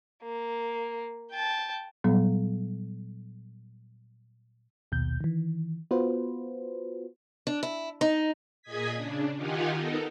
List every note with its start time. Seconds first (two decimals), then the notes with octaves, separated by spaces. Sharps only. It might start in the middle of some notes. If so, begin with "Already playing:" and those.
0.23 A#3
1.31 G5 A5
2.04 A#2 F#3 G3 B3
4.92 A#1 D#2 B2 G6
5.21 D#3 E3
5.91 B3 F4 F#4 B4 C5
7.47 D4
7.63 E4
8.01 D#4
8.62 A#2 G#4 D#5 D#6 G#6 B6
8.93 C#3 D4
9.34 D#3 D#4 F4 G4 F#5 G#5
9.73 B3 D#4 A4 A#4